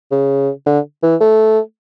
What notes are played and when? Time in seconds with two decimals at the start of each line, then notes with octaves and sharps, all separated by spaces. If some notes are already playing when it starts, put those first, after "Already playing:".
0.11 C#3
0.66 D3
1.03 E3
1.21 A3